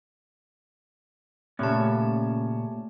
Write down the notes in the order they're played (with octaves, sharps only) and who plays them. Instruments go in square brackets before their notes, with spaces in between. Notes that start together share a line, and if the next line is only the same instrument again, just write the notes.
[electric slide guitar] A#2 C#3 C#4 [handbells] A3 G4 A5